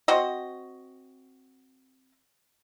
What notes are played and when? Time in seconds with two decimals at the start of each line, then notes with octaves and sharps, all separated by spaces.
0.08 C4 F#4 D#5